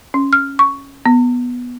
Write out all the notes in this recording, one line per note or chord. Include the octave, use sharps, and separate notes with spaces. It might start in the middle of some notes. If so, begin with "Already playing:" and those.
C#4
F6
C#6
B3